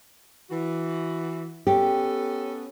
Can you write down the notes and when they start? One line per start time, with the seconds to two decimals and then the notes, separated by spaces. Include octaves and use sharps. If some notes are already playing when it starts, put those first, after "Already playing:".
0.50 E3 F#4
1.67 B3 C#4 G4 A4